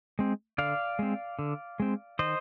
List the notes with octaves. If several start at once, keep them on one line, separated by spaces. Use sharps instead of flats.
G#3 C4
D3 D5 F5
G#3 C4
D3
G#3 C4
D#3 C5 D#5